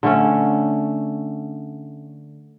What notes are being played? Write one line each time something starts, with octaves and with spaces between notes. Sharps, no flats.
D3 A3 C#4